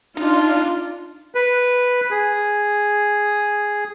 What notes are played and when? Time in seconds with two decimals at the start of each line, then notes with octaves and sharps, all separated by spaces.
0.17 D4 D#4 F4
1.35 B4
2.11 G#4